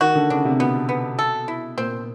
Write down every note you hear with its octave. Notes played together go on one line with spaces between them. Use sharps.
D#3 F#4
D3
C#3 D4
C3
B2 B3
B3
A4
E4
A#2 C4